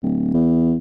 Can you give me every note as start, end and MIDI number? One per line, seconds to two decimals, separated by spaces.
0.03 0.30 26
0.34 0.76 40